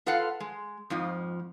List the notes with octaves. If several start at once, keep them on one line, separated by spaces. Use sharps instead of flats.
F4 A4 B4 F5 F#5
G#3
F2 G#2 F3